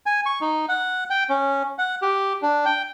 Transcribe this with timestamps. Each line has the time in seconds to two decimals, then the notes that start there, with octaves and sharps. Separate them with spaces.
0.06 G#5
0.26 C#6
0.41 D#4
0.69 F#5
1.10 G5
1.30 C#4
1.78 F#5
2.02 G4
2.42 D4
2.65 G5